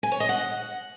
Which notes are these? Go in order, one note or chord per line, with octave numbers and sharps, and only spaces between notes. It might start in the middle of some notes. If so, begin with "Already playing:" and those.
G#5
C#5
D#5
F#5